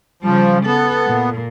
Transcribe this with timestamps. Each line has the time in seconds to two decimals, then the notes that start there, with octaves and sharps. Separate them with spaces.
0.23 C#3 F3 G3
0.66 B3 A4
1.07 A#2